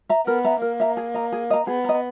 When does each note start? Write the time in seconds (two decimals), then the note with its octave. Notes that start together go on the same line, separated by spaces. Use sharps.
0.09 E5 A#5
0.27 B3 A#4
0.45 E5 A#5
0.62 A#3 A#4
0.80 E5 A#5
0.97 G#4
1.14 D#5 A#5
1.32 G#4
1.50 D#5 A#5
1.67 B3 G#4
1.84 D#5 A#5